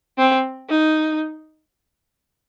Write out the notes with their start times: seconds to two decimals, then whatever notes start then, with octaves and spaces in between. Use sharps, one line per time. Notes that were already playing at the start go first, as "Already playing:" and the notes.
0.18 C4
0.69 D#4